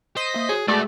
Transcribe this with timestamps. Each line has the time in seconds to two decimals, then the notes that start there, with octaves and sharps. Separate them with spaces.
0.17 C5 D#5 B6
0.34 A#3 E5
0.49 F#4 G#4 C#5
0.68 G#3 A3 F#4 G#4 B4 D5